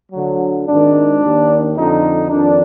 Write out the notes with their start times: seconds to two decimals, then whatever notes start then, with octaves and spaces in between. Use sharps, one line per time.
0.12 D2 D3 F#3
0.67 G#1 G#2 D#3 D4
1.22 D#2 D#3
1.75 F2 D3 D#4
2.30 F2 D#3 D4